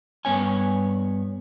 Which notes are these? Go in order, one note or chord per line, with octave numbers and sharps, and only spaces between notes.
G2 B3 C#5 G#5